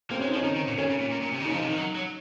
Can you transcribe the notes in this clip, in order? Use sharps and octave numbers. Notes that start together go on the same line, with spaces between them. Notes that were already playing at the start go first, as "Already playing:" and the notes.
A#3 C4
G#3 C#4
D#4
F3
C#4
D#3
D#3
A#2
D#3 C#4
C#3
A#2
A#2
A#2
C3
D#3
C#3 D#4
F3
C3
D#3
F#3
F#3